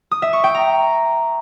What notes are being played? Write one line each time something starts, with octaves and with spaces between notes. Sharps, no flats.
D#6
E5
C#6
G5
A#5